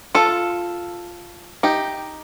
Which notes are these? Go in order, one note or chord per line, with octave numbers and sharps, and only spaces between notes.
F4 A4
D#4 G4